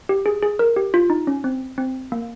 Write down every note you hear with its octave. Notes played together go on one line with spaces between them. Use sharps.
G4
G#4
G#4
A#4
G4
F4
D#4
C#4
C4
C4
A#3